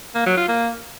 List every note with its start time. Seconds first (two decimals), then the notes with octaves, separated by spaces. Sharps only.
0.15 A#3
0.26 F#3
0.37 F4
0.48 A#3